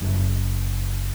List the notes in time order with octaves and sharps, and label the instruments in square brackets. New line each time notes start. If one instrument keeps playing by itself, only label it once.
[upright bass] F#1